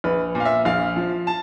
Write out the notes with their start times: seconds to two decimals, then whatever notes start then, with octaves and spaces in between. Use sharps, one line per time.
0.04 A#1 B4
0.35 A#2
0.40 F5
0.45 E5
0.65 A#1 F5
0.96 F3
1.27 A5